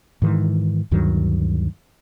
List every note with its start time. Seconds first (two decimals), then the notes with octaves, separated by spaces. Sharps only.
0.22 G#2 D#3 E3
0.91 D2 G2 D#3 F#3